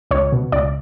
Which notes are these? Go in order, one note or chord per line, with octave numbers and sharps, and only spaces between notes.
C#2 C#5
B2
C#2 D5